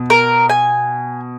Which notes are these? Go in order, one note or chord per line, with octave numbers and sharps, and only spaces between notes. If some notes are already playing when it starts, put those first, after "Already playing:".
Already playing: B2
A#4
G#5